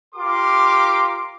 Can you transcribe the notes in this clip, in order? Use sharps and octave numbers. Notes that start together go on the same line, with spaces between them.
F4 G4 A#4 C6 D6